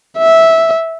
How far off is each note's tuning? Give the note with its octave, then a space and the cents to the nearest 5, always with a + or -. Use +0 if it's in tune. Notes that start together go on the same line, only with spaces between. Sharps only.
E5 -10